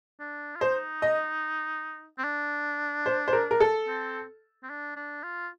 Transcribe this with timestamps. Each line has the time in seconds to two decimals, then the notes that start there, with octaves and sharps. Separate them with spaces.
0.20 D4
0.56 F4
0.61 D#4 C5
1.02 D#5
2.18 C4
2.24 D4
3.06 C5
3.28 C5
3.33 A#4
3.51 A#4
3.60 A4
3.87 C4
4.63 C4
4.70 D4
4.97 D4
5.24 F4